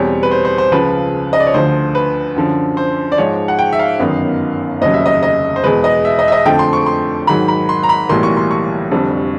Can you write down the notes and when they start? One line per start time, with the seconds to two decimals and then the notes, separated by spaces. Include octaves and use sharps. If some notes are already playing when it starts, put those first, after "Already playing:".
Already playing: E2 B2 G3 C4 C#5
0.23 B4
0.31 C5
0.45 C5
0.58 C5
0.72 C#2 C#3 F3 B4
1.33 D#5
1.40 D5
1.47 C#5
1.54 D2 D3 F3 C5
1.95 B4
2.36 F#2 D3 F3
2.77 C5
3.12 D5
3.18 G#2 F3 G#3 C#5
3.48 F#5
3.59 G5
3.73 E5
3.79 F5
3.99 G1 F#2 D#3 F#3 B3
4.81 F1 D#2 C#3 F#3 D#5
4.94 E5
5.06 D#5
5.23 D#5
5.56 C5
5.64 E2 B2 G#3 B4
5.84 D#5
6.05 E5
6.19 D#5
6.28 E5
6.32 D#5
6.46 F2 D3 F3 A3 G5
6.59 C6
6.73 C#6
6.86 C6
7.27 G#2 D#3 F#3 B5
7.48 B5
7.69 C6
7.83 A#5
7.89 B5
8.09 B1 A2 E3 G3 A#3 C6
8.23 C#6
8.37 C6
8.51 C#6
8.92 F1 F2 D3 G3